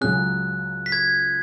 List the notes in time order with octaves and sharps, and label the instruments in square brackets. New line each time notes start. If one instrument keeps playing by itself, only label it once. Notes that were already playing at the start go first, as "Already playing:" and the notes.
[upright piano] C#2 C#3 F#3 C#4 G#4 [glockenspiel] F#6
[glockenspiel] B6
G#6